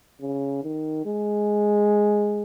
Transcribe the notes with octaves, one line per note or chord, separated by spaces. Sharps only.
C#3
D#3
G#3